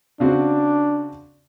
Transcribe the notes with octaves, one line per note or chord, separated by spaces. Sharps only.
C#3 C4 D4 F#4